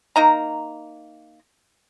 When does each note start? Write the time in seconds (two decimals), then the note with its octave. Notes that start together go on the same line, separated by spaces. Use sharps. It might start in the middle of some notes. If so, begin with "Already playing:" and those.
0.16 A#3 D#4 A#5